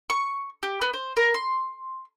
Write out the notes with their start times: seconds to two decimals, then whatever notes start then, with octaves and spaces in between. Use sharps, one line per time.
0.10 C#6
0.63 G4
0.82 B3
0.93 C5
1.17 A#4
1.34 C6